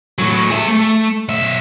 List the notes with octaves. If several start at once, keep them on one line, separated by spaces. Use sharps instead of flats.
A2 F#3
G#4 E5
A3
B1 E5